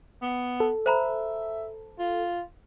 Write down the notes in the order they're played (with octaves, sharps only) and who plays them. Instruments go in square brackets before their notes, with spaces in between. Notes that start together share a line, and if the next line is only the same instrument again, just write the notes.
[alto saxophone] B3
[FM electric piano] A4
[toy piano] C5 A#5 B5 [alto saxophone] E5
[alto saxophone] F4